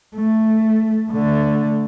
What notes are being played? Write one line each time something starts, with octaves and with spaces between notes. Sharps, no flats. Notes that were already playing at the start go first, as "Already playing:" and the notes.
A3
D3 A3